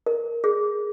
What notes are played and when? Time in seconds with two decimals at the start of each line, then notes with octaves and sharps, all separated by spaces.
0.06 A#4
0.44 G#4